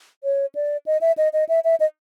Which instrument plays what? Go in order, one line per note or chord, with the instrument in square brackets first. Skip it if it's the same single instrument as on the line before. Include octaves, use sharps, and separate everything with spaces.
[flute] C#5
D5
D#5
E5
D#5
D#5
E5
E5
D#5